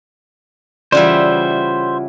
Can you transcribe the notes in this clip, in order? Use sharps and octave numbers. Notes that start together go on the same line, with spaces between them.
C#3 E3 G3 F4 C5 D5 E5 F#5